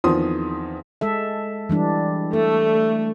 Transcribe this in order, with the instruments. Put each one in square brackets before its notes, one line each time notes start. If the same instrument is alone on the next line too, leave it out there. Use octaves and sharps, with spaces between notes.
[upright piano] E2 D#3 F3 C4 C6 D#6
[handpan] G#3 A4 E5
E3 G3 D4
[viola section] A3 [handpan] A4